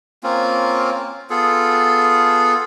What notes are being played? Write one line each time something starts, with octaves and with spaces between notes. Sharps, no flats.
A#3 C4 C#4 F4
B3 F4 G#4 A4